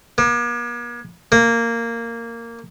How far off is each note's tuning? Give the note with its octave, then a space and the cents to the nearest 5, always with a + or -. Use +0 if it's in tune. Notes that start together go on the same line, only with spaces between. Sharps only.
A#3 +45
A#3 -10